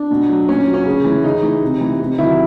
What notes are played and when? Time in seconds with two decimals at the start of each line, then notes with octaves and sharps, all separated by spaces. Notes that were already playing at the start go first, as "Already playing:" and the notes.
Already playing: D4
0.11 B2
0.29 F#3
0.48 A#2 C#4
0.67 F#3
0.74 C#4
0.86 C#3
1.04 E3
1.24 C#3 D#4
1.43 E3
1.62 C3
1.81 E3
1.99 C3
2.18 D#3 F#3 E4